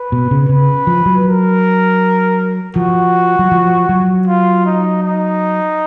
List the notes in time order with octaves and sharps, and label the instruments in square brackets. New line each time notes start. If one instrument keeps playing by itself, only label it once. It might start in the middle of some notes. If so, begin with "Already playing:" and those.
Already playing: [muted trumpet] B4
[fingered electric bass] B2
C#3
[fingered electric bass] C#3 [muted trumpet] B4
[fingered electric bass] F3
F#3
[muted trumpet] A#4
[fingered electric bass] F3 [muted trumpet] F#4
[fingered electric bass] F#3
F3
F#3
[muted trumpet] F4
D#4
D#4